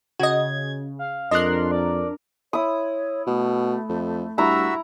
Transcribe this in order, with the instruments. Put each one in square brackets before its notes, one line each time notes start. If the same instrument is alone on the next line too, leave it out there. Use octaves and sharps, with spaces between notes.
[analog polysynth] C#3 [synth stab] F#4 D#5 [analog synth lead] G#6
[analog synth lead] F5
[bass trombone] F2 [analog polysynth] D4 A#4 [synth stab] D#5 F#6 [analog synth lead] C6
[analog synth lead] D5
[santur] E4 D#6 [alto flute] C#5
[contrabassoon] B2 [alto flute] A3
[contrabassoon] F2
[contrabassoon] G2 [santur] E4 A#5 [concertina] F#4 E5 E6